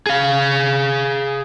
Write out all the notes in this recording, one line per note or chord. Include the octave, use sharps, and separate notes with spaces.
G#4 F5